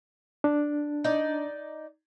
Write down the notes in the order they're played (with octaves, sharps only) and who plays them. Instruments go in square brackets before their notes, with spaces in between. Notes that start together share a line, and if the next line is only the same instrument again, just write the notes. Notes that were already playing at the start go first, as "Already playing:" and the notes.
[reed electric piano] D4
[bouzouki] D#4 D5